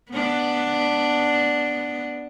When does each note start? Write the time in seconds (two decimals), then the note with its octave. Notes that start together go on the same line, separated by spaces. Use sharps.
0.12 B3 D4